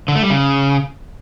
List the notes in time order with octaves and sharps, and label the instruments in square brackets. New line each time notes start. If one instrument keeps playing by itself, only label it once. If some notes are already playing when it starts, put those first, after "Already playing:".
[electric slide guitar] D3
A3
G3
C#3